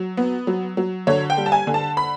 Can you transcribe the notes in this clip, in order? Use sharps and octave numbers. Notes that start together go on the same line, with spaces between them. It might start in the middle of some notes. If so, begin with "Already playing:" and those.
Already playing: F#3
B3
F#3
F#3
D3 C#5
G5
G3
A5
G#5
D3
A5
B5